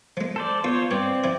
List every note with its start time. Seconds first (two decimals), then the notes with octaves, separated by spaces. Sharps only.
0.17 F3 G#3
0.36 A4 C5 D5
0.64 E2 F4 C5 C#5 C#6
0.91 G2 C4 C#5 D5
1.24 F3 E4